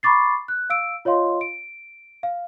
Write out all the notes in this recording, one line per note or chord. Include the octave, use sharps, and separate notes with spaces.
A#5 B5 C#6 D6 A6 C7
F#6
F5 E6 D7
F4 C#5 D#5 F5 C6
D7
F5